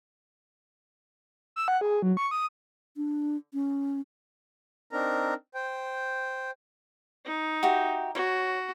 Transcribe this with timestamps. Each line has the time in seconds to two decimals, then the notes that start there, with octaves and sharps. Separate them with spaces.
1.56 E6
1.68 F#5
1.81 G#4
2.02 F#3
2.17 C#6
2.31 D#6
2.97 D4
3.53 C#4
4.91 C4 D4 D#4 A#4 A#5
5.54 C5 G5
7.25 D#4
7.63 F#4 G4 E5
8.15 F#4 C#5